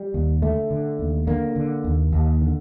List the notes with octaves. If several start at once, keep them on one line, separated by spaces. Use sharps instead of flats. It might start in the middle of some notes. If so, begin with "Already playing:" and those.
Already playing: G3
D#2
D3 A3
D3
D#2
D3 A#3
D3
D#2
D#2
D3